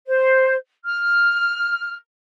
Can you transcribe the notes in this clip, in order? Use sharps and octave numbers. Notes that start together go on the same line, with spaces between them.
C5
F6